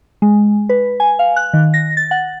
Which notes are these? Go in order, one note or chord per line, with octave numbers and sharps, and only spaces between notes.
G#3
B4
G#5
F5
F#6
D#3
A#6
A6
F#5